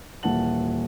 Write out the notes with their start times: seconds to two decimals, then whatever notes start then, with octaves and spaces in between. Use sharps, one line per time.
0.23 D#1 A#2 E3 F#5 A5 F#7